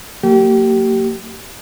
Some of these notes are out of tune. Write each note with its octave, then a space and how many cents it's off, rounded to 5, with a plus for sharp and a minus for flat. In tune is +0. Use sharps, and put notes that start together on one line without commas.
F#3 -35 A#3 -35 G4 -25